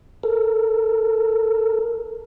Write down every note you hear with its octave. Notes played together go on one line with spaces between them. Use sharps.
A4 A#4